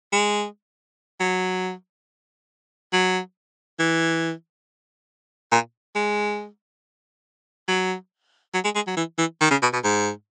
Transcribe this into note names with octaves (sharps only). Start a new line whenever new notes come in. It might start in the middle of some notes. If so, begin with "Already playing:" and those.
G#3
F#3
F#3
E3
A#2
G#3
F#3
F#3
G#3
G#3
F#3
E3
E3
D#3
C#3
B2
B2
G#2